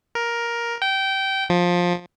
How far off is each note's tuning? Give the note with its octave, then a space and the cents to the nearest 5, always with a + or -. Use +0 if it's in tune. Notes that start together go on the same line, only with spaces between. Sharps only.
A#4 +10
G5 -20
F3 +15